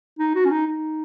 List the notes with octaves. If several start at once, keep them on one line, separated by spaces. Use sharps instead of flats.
D#4
F#4
C#4
D#4
D#4